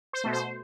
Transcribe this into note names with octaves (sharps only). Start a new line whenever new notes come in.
C5
B2 A3
C5